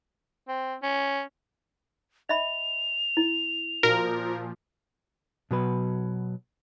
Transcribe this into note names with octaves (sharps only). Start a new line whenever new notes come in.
C4
C#4
D#5 E5 B5 F7
E4
A#2 F3 F#4 A#4
B2 F#3 B4